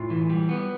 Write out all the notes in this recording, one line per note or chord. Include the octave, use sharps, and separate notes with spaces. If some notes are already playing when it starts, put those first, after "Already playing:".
Already playing: A2 F4
E3
G3
B3